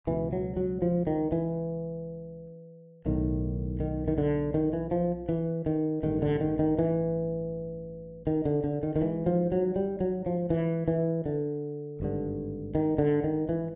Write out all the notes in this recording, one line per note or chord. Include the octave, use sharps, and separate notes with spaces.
C#2 B2 E3
F#3
F#3
F3
D#3
E3
B1 A2 D#3
D#3
D#3
D3
D#3
E3
F3
E3
D#3
A1 G2 D3 D#3
D3
D#3
D#3
E3
D#3
D3
D3
D#3
D#3
G#1 G#2 E3
F3
F#3
G3
F#3
F3
E3
E3
D3
G#1 G2 D3
D#3
D3
D#3
E3